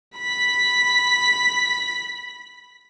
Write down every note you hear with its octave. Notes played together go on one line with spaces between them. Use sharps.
B5 B6